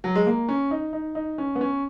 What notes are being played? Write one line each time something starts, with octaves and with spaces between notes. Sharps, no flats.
F#3
G#3
A#3
C#4
D#4
D#4
D#4
C#4
B3
C#4